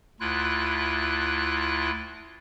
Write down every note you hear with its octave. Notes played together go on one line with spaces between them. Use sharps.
D2 E4 F4 F#6